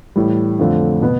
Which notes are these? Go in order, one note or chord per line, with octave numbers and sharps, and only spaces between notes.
A2 E3 G3
F2 D3 A3 C4 F4
B2 B3